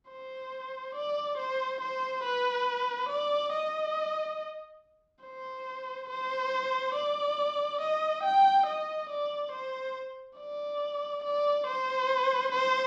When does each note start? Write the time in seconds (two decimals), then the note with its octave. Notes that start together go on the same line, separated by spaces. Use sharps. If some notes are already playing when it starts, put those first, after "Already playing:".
0.09 C5
0.95 D5
1.38 C5
1.81 C5
2.24 B4
3.09 D5
3.52 D#5
5.23 C5
6.09 C5
6.95 D5
7.81 D#5
8.24 G5
8.66 D#5
9.09 D5
9.52 C5
10.38 D5
11.24 D5
11.67 C5
12.52 C5